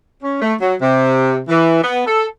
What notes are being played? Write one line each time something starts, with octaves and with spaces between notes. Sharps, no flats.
C#4
A3
F#3
C3
E3
B3
A4